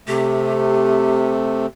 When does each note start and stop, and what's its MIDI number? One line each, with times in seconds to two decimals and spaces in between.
0.08 1.67 48
0.08 1.67 57
0.08 1.66 67